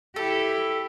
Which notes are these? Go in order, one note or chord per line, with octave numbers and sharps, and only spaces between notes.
E4 G4 A4